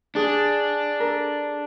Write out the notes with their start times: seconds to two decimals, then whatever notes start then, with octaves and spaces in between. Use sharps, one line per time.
0.15 D4 G#4
1.00 A#4
1.07 A4